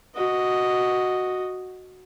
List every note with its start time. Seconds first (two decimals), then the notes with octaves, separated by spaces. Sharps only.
0.15 F#4 D#5